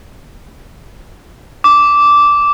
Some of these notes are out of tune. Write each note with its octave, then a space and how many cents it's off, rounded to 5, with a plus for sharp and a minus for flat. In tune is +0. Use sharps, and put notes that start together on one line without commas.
D6 -10